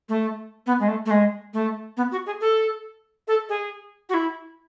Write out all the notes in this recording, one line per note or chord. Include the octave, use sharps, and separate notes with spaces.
A3
B3
G#3
A3
A3
G#3
A3
B3
F#4
G#4
A4
A4
G#4
F#4
E4